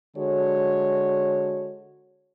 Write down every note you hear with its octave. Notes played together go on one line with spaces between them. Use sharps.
D3 G#3 F#4 C#5